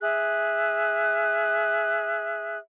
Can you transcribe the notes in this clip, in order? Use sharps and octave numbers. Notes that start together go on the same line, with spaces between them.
G#4 E5 F#6